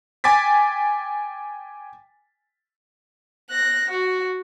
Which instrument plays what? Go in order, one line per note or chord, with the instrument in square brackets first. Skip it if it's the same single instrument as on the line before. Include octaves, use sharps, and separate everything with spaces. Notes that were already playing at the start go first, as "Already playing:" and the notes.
[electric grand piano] G5 G#5 D6 A6 B6
[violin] F#6 A#6
F#4